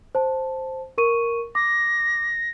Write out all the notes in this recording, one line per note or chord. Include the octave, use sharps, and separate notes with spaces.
C5 A5
A#4 C#6 D#7
D6 A#6